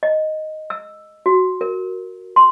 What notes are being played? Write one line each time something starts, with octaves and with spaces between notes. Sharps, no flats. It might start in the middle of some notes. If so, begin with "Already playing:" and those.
D#5
E6
F#4
A#4
C6